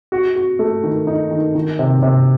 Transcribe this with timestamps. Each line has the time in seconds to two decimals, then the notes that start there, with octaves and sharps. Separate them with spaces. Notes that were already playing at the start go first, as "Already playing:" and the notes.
0.12 F#4
0.36 F#4
0.59 A3
0.83 D#3
1.07 D#4
1.31 D#3
1.55 D#3
1.79 C3
2.03 C3